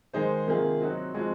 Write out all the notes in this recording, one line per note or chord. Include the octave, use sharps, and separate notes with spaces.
D#3 G#3 D#4 G#4 C5
C3 D#3 A#3 F4 G#4
F#3 C4 D#4 F#4
F3 G#3 C4 F#4